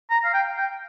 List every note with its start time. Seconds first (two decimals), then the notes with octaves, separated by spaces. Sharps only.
0.11 A#5
0.25 F5
0.34 G5
0.58 G5